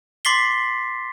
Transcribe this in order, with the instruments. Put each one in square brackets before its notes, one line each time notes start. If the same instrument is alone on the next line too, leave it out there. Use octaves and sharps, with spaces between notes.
[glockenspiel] C6 D6 A6 B6 C7 G7